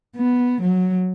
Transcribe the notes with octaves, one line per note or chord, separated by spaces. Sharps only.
B3
F#3